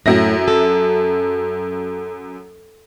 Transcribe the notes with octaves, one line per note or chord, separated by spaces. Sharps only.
F#2 A2 E5 A#6
A4